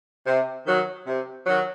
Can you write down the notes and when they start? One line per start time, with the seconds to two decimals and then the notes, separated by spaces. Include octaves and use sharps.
0.25 C3
0.65 D#3 F#3
1.05 C3
1.46 D#3 F#3